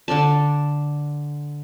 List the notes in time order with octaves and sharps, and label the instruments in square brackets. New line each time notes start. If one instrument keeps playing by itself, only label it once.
[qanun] D3 D4 D5 A5